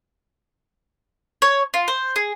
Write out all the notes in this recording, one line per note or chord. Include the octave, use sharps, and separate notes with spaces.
C#5
F4
C5
G#4